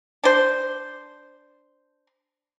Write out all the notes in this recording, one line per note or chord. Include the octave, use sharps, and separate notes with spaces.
D4 C5